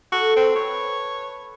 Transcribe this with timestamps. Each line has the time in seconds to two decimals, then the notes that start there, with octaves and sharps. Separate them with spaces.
0.12 F#4 A4
0.36 C4
0.55 B4 C#5